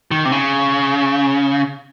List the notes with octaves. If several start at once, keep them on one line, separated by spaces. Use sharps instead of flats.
D#3
C3
C#3